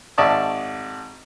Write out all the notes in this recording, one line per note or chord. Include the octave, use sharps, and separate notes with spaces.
G#1 D5 E5 A5 C#6 D#6